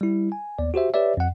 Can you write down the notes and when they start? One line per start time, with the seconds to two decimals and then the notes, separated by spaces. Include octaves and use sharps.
0.01 G3 E4
0.32 G#5
0.59 D#2 B3 D5
0.74 F#4 G4 C5 E5
0.94 G4 B4 C#5 D5 E5
1.17 F2 F#5